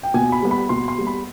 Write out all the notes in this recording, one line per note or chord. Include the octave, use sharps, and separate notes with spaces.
G5
B2 G#5
B5
G3 B3
B5
B2 C6
C6
G3 B3
B5